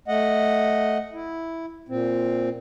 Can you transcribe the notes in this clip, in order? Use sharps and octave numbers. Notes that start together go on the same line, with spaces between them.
A3 D#5 F#5
E4
A#2 C4